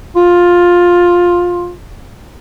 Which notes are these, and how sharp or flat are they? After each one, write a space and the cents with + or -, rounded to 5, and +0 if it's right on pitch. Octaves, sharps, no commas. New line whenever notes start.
F4 +10